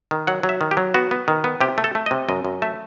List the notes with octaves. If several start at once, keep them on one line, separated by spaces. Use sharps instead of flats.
D#3
F#3 F#5
F#3
E5
D#3
G4
F#3
B3 F#4
B3
D#3
B3
C3 G4
A3
A4
A3
D#5
C3
F#2 D#5
F#2
A3 E5